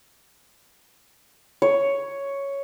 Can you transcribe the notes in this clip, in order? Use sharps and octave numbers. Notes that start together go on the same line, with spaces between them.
C#5